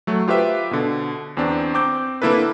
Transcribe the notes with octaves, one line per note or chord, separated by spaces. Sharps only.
F#3 A3
F4 G4 B4 C5 E5 G5
B2 D3
E2 C4 D4
C4 D6 G6
D3 A#3 E4 A4 B4